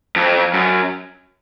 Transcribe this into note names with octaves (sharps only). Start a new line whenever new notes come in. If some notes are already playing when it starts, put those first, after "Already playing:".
F2
F#2